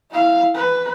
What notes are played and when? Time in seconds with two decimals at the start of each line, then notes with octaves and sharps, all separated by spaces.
0.11 E4 F5
0.55 B4